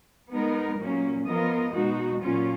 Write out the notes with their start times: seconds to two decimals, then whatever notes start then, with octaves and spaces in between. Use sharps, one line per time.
0.31 G#3 B3 D#4 A#4
0.79 A#2 F#3 A#3 C#4
1.27 F3 B3 F4 A#4 D#5
1.75 B2 G#3 D#4 F#4
2.22 A#2 F#3 C#4 F4